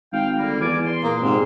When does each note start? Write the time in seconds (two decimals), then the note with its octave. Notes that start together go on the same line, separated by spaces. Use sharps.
0.13 G#1 F5 G5
0.38 D3 G3 A#3
0.61 E2 D5 G#5 D6
0.86 C6
1.04 A#2 A#3 G#4 C6
1.22 G#2 C3